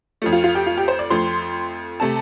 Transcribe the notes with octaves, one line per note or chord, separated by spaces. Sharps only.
F2 F3 A3
F4
F4
G4
F4
G4
C5
D5
F2 F3 A3 C6
C3 A3 A5